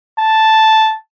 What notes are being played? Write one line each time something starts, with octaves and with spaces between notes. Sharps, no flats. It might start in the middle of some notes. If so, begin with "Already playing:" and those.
A5